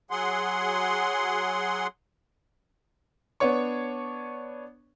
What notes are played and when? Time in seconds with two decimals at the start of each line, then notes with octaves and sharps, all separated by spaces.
0.11 F#3 G#4 F#5 C6
3.40 B3 D4 C#5 C#6